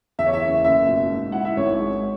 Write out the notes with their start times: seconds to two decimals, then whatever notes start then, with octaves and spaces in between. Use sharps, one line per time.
0.19 E2 E5
0.27 C#5
0.33 E5
0.42 F#1
0.64 F#1 E5
0.89 B2
1.11 G#2
1.32 E4 F#5
1.45 E5
1.57 G#1 C#5
1.80 G#3